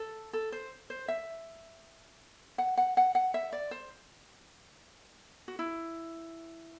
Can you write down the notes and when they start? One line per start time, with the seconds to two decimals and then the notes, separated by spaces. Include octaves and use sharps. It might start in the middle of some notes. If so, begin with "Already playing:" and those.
Already playing: A4
0.33 A4
0.52 C5
0.90 C5
1.08 E5
2.58 F#5
2.77 F#5
2.97 F#5
3.15 F#5
3.34 E5
3.52 D5
3.71 C5
5.48 F#4
5.59 E4